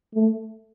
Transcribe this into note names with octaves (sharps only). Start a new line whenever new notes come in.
A3